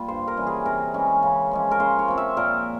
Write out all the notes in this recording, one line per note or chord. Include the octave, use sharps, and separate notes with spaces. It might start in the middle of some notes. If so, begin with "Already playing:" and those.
Already playing: G3 A#3 F4
G2 C5
A#4
E3 G3 C#4
G#4
C3 A#4
E3 G#3 C#4
C#3
F3 G#3 C#4
A#4
C#3 C5
C#5
F3 C4
E5
A#2 A#4